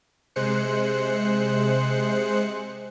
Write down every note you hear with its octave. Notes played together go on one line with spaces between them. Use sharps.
C3 G#3 C5 F#6 C#7